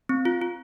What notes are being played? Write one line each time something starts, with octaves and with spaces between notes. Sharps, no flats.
C4
F4
F4